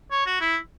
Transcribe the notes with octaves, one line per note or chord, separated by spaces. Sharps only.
C#5
F#4
E4